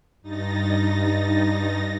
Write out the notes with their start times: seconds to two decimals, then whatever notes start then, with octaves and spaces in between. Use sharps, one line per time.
0.22 G2 D#4 A6 A#6